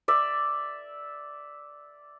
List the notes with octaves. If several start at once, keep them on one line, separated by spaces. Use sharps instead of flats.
D5 E5